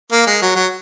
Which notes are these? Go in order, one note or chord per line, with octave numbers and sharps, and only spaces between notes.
A#3
G#3
F#3
F#3